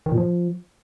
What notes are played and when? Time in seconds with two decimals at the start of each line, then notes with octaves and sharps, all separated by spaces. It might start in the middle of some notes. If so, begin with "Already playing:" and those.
0.06 D#3
0.12 A#2
0.18 F3